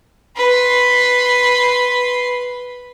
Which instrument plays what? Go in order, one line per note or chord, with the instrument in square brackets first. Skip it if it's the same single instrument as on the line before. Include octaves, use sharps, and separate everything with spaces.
[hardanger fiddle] B4 C6